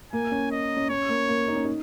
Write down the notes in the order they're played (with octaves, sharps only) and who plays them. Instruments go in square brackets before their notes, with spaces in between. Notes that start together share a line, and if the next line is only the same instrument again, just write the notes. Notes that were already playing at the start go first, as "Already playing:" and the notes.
[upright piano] A#3 [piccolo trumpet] G#5
[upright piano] C#4
[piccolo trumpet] D#5
[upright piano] C#4
[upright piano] C#4 [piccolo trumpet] C#5
[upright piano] A#3
A#3
D#4
C#4
D#4